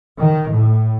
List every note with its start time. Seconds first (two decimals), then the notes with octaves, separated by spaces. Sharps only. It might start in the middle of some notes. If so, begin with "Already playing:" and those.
0.20 D#3
0.52 A2